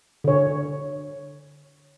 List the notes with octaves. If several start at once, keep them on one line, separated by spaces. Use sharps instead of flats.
D3 C#5